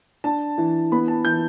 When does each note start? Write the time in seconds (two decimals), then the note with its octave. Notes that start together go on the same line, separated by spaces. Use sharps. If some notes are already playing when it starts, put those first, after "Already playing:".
0.24 D4 A5
0.58 E3
0.92 B3 B5
1.08 A5
1.25 E3 G6